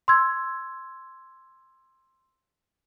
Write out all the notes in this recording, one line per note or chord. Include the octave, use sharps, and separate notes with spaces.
C6 E6 G#6